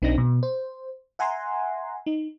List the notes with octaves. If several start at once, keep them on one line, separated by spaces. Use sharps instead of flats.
B1 C4 D4 D#4 A#6
B2
C5
E5 F#5 G#5 A#5 C6
D#4